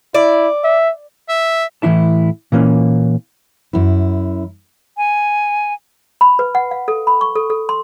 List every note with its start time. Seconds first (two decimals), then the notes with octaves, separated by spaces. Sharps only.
0.14 E4 D5
0.64 E5
1.29 E5
1.82 A2 E3 C#4 D4 E4 A5
2.52 A#2 E3 A#3 C#4
3.73 F#2 E4
4.97 G#5
6.21 B5
6.39 B4
6.55 F#5
6.71 F5
6.88 A4
7.07 B5
7.21 C#6
7.35 A4
7.50 A4
7.69 C6